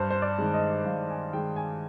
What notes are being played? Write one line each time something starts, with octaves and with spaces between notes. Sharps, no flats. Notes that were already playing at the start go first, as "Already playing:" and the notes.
Already playing: G2 C5
C5
D5
D#3 G#3
D#5
G2 F5
G#5
D#3 G#3 G5
G#5